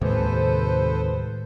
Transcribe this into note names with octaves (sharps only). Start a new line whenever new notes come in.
D#2 A2 C3 G#3 A4 B4 C5